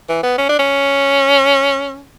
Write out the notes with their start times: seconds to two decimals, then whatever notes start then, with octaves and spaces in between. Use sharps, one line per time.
0.09 E3
0.23 B3
0.38 C#4
0.49 D4
0.59 C#4